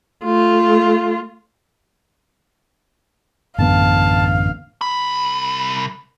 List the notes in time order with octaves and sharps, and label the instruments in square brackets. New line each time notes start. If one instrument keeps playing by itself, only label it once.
[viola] A3 F4
[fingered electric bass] A1 D3 B3 [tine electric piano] F#2 [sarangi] F5 [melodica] A5
[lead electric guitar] C2 B5